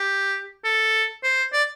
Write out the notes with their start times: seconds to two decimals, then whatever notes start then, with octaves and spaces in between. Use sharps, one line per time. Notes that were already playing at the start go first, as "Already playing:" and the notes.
Already playing: G4
0.64 A4
1.23 C5
1.53 D5